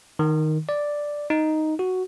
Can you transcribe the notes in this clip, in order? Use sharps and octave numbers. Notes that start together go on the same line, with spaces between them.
D#3
D5
D#4
F#4